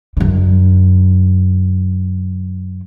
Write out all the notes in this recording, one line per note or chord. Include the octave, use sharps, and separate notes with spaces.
F#2 D3